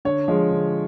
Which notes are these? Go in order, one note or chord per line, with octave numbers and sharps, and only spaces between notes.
D3 C#5
F3 G#3
D3